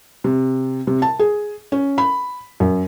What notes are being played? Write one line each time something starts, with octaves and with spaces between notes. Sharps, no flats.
C3
C3
A5
G#4
C#4
B5
F#2